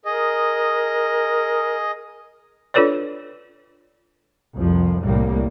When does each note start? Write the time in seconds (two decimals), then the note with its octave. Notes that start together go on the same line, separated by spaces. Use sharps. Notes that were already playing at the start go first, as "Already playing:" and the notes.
0.05 G#4 A#4 D#5
2.74 D4 F4 A4 B4 C#5 D5
4.55 C2 F2 F3
5.03 C2 A2 G3 A#3